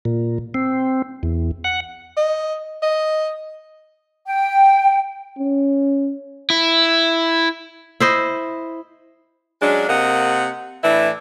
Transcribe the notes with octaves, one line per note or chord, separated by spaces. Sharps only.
A#2
C4
E2
F#5
D#5
D#5
G5
C#4
E4
E4 C5 D#5
F#3 G#3 C#4 D4
C3 A#3 D#5 F#5
A2 E3 D4 E4